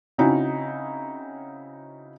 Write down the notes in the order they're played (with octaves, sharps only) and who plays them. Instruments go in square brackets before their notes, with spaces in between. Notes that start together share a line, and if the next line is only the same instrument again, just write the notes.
[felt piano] C#3 C4 C#4 D#4 E4 F#4